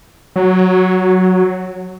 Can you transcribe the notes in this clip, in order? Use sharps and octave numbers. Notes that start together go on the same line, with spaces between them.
F#3